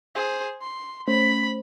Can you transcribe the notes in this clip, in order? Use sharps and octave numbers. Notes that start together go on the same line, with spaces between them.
G#4 C5
C6
A3 C#4 C5 B5